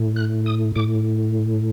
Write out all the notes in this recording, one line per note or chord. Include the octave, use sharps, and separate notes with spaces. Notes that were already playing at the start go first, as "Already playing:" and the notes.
Already playing: A2
F#6
D#6
A2 D6